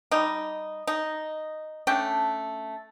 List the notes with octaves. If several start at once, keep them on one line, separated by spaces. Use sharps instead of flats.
G3 D#4
D#4
A3 C#4 D4 G5